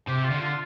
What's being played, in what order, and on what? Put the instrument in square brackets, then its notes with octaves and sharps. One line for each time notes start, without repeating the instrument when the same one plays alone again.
[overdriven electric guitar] C3 [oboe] G4
[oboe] F4
[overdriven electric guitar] D3
[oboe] F4